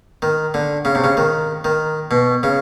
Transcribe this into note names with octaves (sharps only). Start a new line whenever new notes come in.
D#3
D3
C#3
C3
C#3
D#3
D#3
B2
C#3